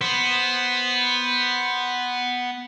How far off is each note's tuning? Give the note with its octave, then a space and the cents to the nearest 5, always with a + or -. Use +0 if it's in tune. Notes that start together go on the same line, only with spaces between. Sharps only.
B3 +0 C5 +0